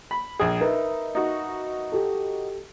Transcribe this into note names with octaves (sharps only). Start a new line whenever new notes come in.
B5
A#1 G#4
D#4 A#4 B4 E5
D#4 F#4
G4 A4